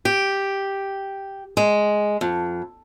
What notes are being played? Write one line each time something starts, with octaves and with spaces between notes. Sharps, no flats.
G4
G#3
F2